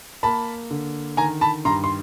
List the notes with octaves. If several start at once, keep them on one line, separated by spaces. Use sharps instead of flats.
A#3 A5 B5
D3
D#3 G#5 A#5
A5 B5
G2 A#5 C6
C6